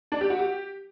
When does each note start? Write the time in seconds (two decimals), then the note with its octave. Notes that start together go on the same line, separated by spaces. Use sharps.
0.12 D4
0.21 G4
0.30 F#4
0.39 G4